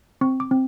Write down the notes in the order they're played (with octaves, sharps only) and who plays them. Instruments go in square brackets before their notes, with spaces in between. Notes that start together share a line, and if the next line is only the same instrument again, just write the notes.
[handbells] C4 C#6
D6
C4